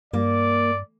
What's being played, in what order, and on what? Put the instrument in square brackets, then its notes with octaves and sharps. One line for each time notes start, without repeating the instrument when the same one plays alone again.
[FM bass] G2 [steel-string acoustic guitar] A#3 [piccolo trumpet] D5